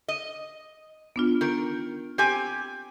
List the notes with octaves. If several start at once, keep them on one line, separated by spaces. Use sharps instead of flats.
D#5
B3 D4 F4
D#3 A#4
C4 G4 G#5